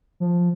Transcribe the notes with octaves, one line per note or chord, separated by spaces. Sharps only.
F3